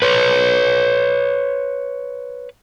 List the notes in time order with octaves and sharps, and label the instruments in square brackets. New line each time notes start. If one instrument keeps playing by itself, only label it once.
[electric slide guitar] B4 C#5